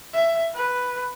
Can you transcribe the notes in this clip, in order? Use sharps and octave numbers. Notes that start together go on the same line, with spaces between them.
E5
B4